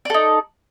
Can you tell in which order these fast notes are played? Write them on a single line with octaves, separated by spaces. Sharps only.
D5 A4 D#4